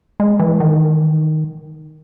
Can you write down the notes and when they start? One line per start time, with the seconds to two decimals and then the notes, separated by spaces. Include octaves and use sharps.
0.20 G#3
0.39 E3
0.60 D#3